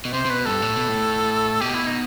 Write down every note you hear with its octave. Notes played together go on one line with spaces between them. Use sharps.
B2
C3 C5
C3
B2 B4
G2 A4
A2
B2
A2
B2 G4
E4
D#4